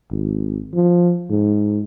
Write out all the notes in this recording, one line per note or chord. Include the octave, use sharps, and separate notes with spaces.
G#1
F3
G#2